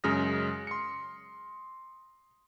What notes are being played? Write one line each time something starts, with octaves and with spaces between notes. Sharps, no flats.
F#2 C#3 G#3 D#6 F6 A#6
C6 C#7